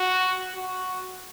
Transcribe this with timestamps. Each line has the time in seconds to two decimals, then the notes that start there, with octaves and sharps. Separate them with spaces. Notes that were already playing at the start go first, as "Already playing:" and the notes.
Already playing: F#4
0.54 F#4